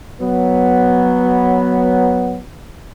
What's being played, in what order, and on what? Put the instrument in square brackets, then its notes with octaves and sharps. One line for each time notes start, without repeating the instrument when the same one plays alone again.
[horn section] F#3 B3